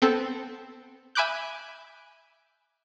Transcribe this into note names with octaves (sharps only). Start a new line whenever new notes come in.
B3 C4 A4
E5 G#5 B5 D6 F#6 G6